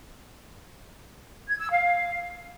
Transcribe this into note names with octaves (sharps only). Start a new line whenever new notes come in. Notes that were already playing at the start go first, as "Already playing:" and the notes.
G#6
E6
F5